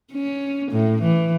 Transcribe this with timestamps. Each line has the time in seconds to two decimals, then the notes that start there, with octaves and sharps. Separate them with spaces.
0.13 C#4
0.71 A2
1.02 E3